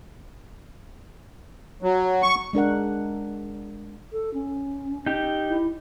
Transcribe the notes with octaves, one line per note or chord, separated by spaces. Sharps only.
F#3
C#6
G#3 D4 A#4 F#5
A4
C#4
D#4 G4
E4